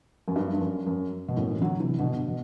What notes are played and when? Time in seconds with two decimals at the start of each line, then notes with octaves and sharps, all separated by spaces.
0.28 F#2
0.36 G2
0.54 G2
0.61 F#2
0.86 F#2
1.28 B2
1.36 F#2 A2
1.51 E3
1.61 D3 F#3
1.80 C3 E3
1.98 B2 D3
2.28 B2